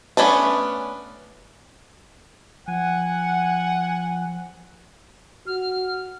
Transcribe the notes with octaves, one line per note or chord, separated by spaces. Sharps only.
A3 B3 C#4 D4 A5
F3 F#5 G#5
F#4 F6